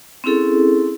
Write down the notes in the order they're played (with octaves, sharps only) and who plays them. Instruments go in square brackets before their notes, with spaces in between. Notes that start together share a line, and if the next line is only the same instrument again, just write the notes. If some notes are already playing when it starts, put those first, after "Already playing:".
[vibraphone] C4 C#4 E4 G#4 A4